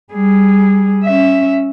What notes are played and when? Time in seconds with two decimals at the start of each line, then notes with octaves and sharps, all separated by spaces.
0.13 G3 G#4
1.04 C#4 E5